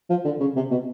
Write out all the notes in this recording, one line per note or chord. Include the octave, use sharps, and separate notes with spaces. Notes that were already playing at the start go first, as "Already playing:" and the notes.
F3
D3
C#3
C3
B2